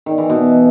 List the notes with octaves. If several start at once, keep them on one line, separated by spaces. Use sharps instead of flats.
D#3
E3
B2